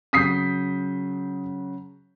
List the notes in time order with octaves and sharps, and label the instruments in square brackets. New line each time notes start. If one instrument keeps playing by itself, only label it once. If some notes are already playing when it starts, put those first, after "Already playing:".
[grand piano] C#3 F#3 G6 [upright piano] D#6 B6 C7